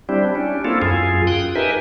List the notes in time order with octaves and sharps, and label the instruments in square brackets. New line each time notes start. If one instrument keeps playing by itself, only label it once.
[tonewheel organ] G3 C4 D4 E4 G4
C#4 D4
A#3 C4 E4 F4 A4
F#2 F4 G#4
G5 D#6 F#6
D#4 G4 A#4 B4 E5 G#5